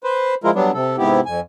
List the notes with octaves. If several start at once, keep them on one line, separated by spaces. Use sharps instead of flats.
B4 C5
F3 G#3 E4 F4 A#4
F#3 G3 B3 D4
C3 A4
G#2 C3 B3 E4 G4
F2 G#5